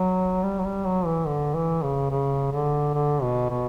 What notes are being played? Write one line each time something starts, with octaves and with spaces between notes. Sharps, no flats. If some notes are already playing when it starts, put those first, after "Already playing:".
Already playing: F#3
G3
F#3
G3
F#3
E3
D3
E3
C#3
C#3
D3
D3
B2
B2